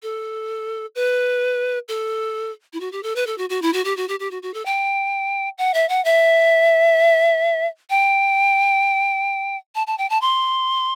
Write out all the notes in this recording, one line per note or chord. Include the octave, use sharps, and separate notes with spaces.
A4
B4
A4
E4
F#4
G4
A4
B4
A4
F#4
F#4
E4
F#4
G4
F#4
G4
G4
F#4
F#4
A4
G5
F#5
E5
F#5
E5
G5
A5
A5
G5
A5
C6